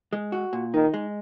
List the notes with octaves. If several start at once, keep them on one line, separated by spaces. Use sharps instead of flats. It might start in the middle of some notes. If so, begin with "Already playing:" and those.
G#3
F#4
A#2
D#3 D#4
G#3